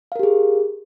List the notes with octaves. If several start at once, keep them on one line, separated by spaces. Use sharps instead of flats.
G4 G#4 A#4 F5